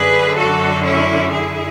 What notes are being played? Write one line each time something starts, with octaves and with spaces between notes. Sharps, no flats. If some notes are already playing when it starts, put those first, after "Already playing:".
Already playing: F#2 D3 G#4 B4
F#4 A4
C#4 E4
E4 G#4